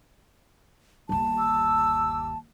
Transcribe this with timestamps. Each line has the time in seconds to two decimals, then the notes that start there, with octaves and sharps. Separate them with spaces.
1.09 G1 D#2 A5
1.37 D6 E6